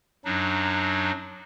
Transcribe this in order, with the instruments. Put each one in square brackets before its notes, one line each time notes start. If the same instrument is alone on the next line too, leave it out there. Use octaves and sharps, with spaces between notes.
[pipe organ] F#2 F#3 D4 D#4